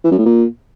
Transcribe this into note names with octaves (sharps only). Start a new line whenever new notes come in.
E3
F#2
A2
A#2